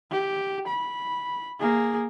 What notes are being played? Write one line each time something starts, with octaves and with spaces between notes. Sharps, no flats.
G4
B5
A#3 G#4